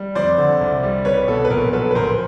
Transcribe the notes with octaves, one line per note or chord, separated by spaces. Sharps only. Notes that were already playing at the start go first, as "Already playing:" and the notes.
Already playing: G3
F2 C5 D5
D3
C2
G3
C2 B4 C#5
B2 A4
B4
A#1 A#4
F#3 A4 B4
B4
A#1 A#4 C5